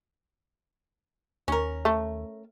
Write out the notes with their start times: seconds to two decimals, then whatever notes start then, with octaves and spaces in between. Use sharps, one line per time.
1.48 D#2 C#4 A#4
1.85 A3